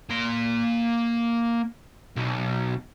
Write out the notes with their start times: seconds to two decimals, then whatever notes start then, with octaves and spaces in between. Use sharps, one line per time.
0.10 A#3 C6
2.16 B1